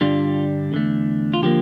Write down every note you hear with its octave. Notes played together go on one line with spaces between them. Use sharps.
G2 D3 G3 D4 F4
E2 D3 A3
F4
D3 F3 A#3 G4